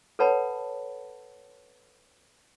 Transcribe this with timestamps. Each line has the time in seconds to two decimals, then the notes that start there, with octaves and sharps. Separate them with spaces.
0.19 A4 B4 C#5 F#5 A5 B5